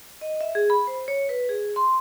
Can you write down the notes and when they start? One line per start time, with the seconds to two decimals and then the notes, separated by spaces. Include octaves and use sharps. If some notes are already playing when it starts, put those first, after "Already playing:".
0.21 D#5
0.41 E5
0.55 G#4
0.70 B5
0.87 C5
1.08 C#5
1.29 B4
1.49 G#4
1.76 C6